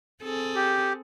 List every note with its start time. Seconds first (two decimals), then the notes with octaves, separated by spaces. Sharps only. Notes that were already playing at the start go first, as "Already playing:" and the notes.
0.23 C4 G#4 A4
0.55 G4